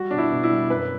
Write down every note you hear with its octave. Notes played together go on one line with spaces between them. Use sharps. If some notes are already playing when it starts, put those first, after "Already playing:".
Already playing: G3 F#4
B2 D4
E4
B2
E4
G3
F#2 B4